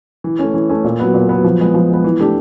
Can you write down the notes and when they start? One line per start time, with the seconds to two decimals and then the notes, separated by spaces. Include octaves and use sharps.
0.24 E3
0.39 A3 C#4
0.54 E3
0.69 A3 C#4
0.84 A#2
1.00 F#3 B3
1.14 A#2
1.29 F#3 B3
1.44 F3
1.60 G#3 B3
1.74 F3
1.90 G#3 B3
2.04 E3
2.20 A3 D4 G4